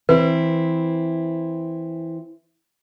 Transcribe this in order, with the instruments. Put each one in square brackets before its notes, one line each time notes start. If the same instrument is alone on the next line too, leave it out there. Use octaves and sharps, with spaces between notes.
[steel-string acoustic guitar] E3 C4 E4 [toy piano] B4